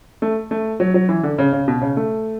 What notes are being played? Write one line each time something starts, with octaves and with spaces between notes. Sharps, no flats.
A3
A3
F#3
F#3
E3
D3
C#3
C#3
B2
C#3
A3